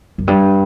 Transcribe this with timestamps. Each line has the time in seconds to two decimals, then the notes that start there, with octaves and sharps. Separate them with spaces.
0.18 F#2
0.27 G2